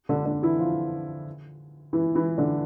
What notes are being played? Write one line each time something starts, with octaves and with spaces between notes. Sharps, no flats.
D3 D4
D3 D4
E3 E4
F3 F4
E3 E4
E3 E4
D3 D4